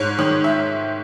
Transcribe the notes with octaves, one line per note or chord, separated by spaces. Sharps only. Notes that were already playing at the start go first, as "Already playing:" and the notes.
Already playing: G#2 C#5
D#3 C#5
E5